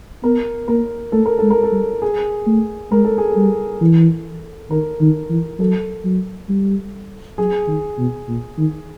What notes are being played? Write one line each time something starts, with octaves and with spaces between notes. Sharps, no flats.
B3 A#4
A#3 A#4
A3 A4
A#4
G#3 A4
A#4
A4
G3
G#4
A3
G#3 A#4
A4
G#4
G3 A4
E3
D#3 A#4
D#3
E3
F#3 A4
F#3
G3
F#3 G#4
D#3
B2
A#2
D#3